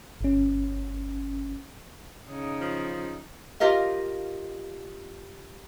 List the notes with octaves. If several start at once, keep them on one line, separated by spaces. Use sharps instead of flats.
G1 C#4
C#3 D#4
F3
F4 G4 A#4 D#5 F5